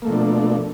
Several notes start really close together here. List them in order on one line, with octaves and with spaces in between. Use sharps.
A#3 A3 B2 F3 D4